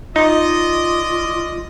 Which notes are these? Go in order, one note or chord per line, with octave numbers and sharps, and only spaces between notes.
D#4 F4 D5 D#5